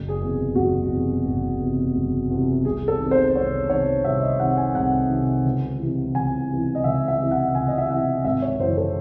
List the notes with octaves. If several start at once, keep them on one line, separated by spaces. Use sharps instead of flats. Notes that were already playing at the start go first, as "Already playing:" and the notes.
Already playing: F#1
G#4
E2 C3
F#1 F#4
E2 C3
F#1
E2 C3
F#1
E2 C3
C2 G#4
A4
C3 D#3
C5
C2 C#5
C3 D#3 C#5
C2 E5
D#5
C3 D#3 F#5
G#5
C2 F#5
C3 D#3
C#2
C3 E3
C#2 G#5
C3 E3
D#5
C#2 E5
E5
C3 E3
F#5
C#2 G#5
D#5
E5
C3 E3 F#5
G#1 E5
C#5
F#2 C#3 E3 C5
A4